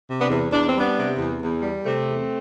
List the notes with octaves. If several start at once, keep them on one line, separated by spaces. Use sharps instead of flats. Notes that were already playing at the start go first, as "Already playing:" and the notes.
C3
B3 D4
E2
E2 D4
C4
G3
B3 D4
C3
E2
E2
G3
C3 A3 C4
E2